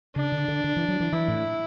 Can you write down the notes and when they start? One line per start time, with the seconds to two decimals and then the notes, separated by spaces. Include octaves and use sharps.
0.16 C#3 D4
0.32 D3
0.48 D3
0.64 D3
0.76 E3
0.88 F#3
1.00 E3
1.12 E3 E4
1.28 A2